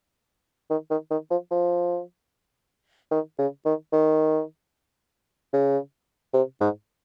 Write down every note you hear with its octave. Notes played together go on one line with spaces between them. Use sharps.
D#3
D#3
D#3
F3
F3
D#3
C#3
D#3
D#3
C#3
C3
G#2